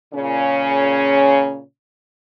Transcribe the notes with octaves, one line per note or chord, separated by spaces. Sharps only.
A#2 C#3 C#4